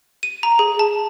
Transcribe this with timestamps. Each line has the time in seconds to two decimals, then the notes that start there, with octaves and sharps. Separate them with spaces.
0.23 D#7
0.43 A#5
0.59 G#4
0.79 A5